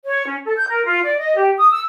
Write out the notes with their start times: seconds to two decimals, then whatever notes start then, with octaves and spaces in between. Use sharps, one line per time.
0.05 C#5
0.26 C#4
0.45 A4
0.57 G6
0.69 A#4
0.85 F4
1.04 D5
1.18 D#5
1.37 G4
1.57 D#6
1.71 E6